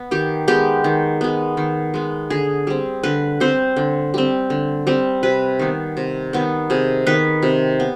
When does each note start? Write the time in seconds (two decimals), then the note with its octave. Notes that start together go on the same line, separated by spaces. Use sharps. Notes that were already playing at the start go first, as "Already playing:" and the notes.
Already playing: B3
0.11 D#3 G4
0.48 G#3 B3 G4
0.84 D#3
1.21 G#3 B3
1.57 D#3
1.94 G#3 B3
2.30 D3 G#4
2.67 G3 C4
3.03 D3 B4
3.40 G3 C4 C5
3.76 D3
4.14 G3 C4
4.50 D3
4.87 G3 C4
5.23 C3 B4
5.59 D#3 B3
5.97 C3
6.33 D#3 B3
6.70 C3 G#4
7.06 D#3 B3 B4
7.43 C3
7.80 B3